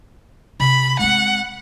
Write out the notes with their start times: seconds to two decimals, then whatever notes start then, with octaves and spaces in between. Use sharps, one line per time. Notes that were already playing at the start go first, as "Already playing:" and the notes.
0.60 C3 B5
0.99 G#3 C4 F#5